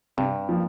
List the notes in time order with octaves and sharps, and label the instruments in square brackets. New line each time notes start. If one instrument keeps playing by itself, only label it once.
[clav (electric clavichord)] G2 [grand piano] C3
[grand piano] F3 A#3